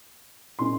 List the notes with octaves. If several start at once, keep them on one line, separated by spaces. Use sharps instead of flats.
A#2 G#3 C#4 C6